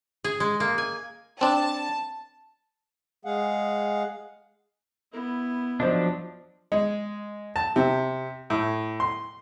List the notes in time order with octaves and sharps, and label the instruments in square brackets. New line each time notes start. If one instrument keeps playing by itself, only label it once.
[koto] G#4
G#3
A#3
G#5
[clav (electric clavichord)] C4 D4 [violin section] A5
[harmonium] G#3 G#4 F5 F#5
[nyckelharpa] B3 E4
[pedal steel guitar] F3 F#3 D4 [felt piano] C5 D5 D#5
[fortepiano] G#3
A5
C3
A2
C6